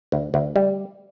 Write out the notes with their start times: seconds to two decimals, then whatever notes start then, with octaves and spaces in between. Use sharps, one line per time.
0.12 D2
0.34 D2
0.56 G3